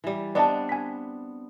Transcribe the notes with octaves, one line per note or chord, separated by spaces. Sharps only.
E3 G3
B3 C4 D4 D5 D#5 A5
G#5 B6